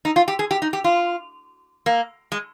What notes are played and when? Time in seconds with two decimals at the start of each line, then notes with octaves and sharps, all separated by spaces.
0.05 D#4
0.16 F4
0.28 G4
0.39 G#4
0.51 G4
0.62 D#4
0.73 G4
0.84 F4
1.86 A#3
2.32 G#3